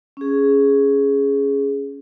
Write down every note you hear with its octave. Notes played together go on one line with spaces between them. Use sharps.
C#4 G#4